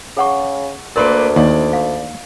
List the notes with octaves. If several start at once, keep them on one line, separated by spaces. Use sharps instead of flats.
C#3 G#4 F#5 C#6
D2 A#3 A#4 B4 D5 C6
D#2 D5
F5